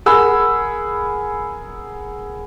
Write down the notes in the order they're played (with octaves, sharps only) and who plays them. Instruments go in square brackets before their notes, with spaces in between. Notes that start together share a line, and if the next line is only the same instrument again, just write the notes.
[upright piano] G#4 A#4 F#5 B5 E6